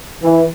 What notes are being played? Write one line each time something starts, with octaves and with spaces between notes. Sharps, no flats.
E3